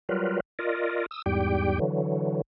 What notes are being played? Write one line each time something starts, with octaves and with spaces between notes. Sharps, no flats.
F#3 G3 F4 A#4 B4
F4 A#4 D5 D#5
D#6 E6
E2 G#2 G3 G4 G5
D3 E3 F#3